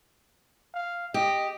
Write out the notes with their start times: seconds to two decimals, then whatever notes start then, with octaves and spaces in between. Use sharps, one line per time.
0.74 F5
1.14 G4 D#5